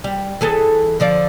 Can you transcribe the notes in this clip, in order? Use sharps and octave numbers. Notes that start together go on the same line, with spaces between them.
G3
E3 G#4 A4
D3 F3 D5